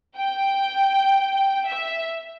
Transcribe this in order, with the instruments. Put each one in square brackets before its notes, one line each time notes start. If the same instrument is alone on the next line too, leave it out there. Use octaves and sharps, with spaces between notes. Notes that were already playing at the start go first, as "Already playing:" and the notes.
[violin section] G5
E5